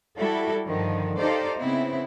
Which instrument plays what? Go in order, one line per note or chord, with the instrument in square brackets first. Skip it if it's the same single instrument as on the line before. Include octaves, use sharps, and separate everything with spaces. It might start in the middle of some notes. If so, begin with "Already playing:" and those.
[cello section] G3 E4 F#4 A4
G2 D3 D#3 F3
D#4 G4 A4 C5 D5 F5
C#3 B3 C4 E4